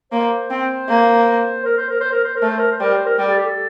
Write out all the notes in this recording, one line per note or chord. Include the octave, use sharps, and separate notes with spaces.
A#3 C5
C4
A#3
A#4
C5
A#4
C5
A#4
C5
A#4
A3
C5
A#4
C5
G3 A#4
C5
A#4
G3 A#4
A4
G4
A4